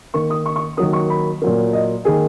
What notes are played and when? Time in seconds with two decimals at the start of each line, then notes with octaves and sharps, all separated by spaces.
0.14 D#3 A#3 C#6
0.30 D#6
0.46 C#6
0.56 C#6
0.77 D#3 F#3 A#3 D#6
0.93 C#6
1.10 B5
1.42 A#2 F#3 A#3
1.73 D#5
2.05 D#3 A#3 G#4